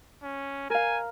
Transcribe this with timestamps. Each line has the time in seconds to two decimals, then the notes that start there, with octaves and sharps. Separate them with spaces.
0.23 C#4
0.70 A#4 F5 G#5